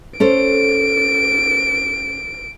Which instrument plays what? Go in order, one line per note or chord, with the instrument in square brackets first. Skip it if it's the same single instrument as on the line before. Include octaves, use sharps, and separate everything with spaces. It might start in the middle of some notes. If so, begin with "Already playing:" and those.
[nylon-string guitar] C#4 A4 C5 [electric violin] D7